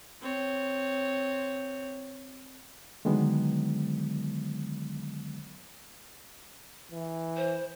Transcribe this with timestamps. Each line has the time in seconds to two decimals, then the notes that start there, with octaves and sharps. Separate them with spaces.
0.22 C4 C#5
3.05 D3 D#3 F#3 G#3 B3
6.92 E3
7.37 C5